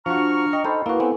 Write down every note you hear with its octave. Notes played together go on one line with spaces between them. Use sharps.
F3 D4 F#4 A#5 C#6 F6
D#5 G5
D#4 A4 C5 B5
A#3 E4 F#4 B4
B3 C4 A4 G#5